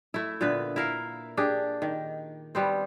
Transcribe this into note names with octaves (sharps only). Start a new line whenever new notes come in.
A3 E4
A#2 D3 B3 B4
E4 A#4 F5
D4 G4 G#4
D#3
G3 B3 C4